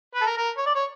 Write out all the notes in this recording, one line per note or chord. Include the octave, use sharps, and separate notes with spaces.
B4
A4
A#4
A#4
C#5
D5
C#5